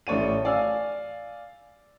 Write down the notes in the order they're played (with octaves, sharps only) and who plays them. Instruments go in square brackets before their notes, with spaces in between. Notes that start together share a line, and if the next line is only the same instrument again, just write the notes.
[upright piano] A1 A3 C#5 D5 D#7
D5 F5 G#5 E6